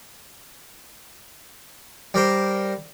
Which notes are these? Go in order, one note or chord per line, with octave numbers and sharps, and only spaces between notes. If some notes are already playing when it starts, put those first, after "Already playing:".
G3 A#4 C5